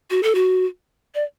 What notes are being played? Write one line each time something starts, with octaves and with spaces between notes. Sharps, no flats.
F#4
A4
F#4
D5